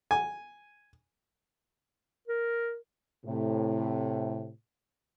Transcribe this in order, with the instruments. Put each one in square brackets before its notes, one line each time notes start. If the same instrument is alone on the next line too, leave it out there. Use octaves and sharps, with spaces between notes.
[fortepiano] G#5
[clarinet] A#4
[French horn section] A2 C3